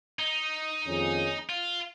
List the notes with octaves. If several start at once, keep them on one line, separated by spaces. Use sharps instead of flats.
D#4
F2 D#3 A#3 C#4 G#4
F4